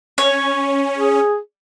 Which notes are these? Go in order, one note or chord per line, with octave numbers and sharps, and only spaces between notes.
C#4 C#5
G#4